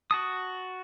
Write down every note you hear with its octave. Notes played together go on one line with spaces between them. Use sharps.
F#4 A5 D#6